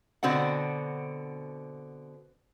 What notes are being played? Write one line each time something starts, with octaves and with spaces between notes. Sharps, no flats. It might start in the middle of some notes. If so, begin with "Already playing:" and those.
B2 D3 C4 F#4 F#5